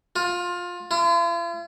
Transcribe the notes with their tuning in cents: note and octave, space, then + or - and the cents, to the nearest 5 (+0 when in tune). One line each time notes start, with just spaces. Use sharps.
F4 +20
F4 -45